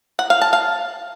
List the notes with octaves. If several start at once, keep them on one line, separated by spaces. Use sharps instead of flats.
F#5
F5
A5
F5